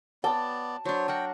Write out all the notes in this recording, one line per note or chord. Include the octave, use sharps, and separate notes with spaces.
B3 D5 G5 A5
F#3 D4 C5 C#5
F#4 A#4 F#5 G5